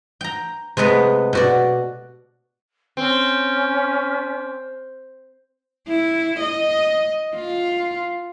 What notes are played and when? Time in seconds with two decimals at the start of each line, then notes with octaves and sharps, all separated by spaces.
0.21 G5 A#5
0.77 C3 G#3 A3 B3 B4
1.33 B2 F#4 D5
2.97 C4 C#4
5.88 E4
6.40 D#5
7.35 F4